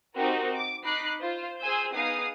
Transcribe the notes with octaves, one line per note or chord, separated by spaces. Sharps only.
C4 D#4 F#4 G4 A#4
D6 D7
D#4 B5 D6 F#6 C7
F4 C5
G#4 C5 G#5 E6 G6
B3 D#4 G#4 F5 D#6 C7